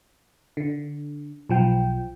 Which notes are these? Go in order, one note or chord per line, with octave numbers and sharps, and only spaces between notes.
D3
B1 F3 G5